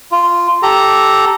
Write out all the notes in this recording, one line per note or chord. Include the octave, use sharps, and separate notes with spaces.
F4
G4 A4 A#5